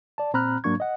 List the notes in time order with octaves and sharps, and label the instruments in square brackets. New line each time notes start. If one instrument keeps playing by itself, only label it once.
[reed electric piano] D5 A5
A#2 C4 A#5 B5 F6 F#6
G#2 F#3 A#3 D4 C#6 G#6
D#5 F#5